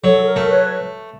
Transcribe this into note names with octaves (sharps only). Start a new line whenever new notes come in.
F#3 A4
A#4
A3
B4 C#5